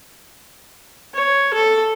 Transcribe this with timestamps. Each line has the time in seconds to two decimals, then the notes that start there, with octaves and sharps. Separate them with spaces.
1.15 C#5
1.54 A4